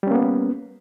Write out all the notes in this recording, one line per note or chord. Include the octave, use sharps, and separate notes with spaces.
G3 A#3 B3 C#4